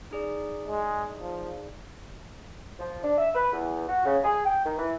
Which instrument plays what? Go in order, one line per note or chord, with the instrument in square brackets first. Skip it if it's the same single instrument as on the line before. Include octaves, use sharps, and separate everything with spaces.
[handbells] D#4 G#4 D5
[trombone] G#3
F3
[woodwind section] F3
D4
E5
B4
E2
F#4
C#3
G#4
G5
D#3
E3